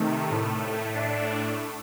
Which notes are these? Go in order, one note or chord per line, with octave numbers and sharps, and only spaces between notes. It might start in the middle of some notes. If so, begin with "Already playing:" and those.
Already playing: C3 D#3 A3
A2 A3
A2 A3 D4